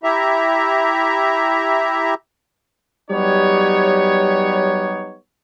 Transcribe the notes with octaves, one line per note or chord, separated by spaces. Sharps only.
E4 G4 E5 A#5
F#3 G3 B3 D#4 G4 C#5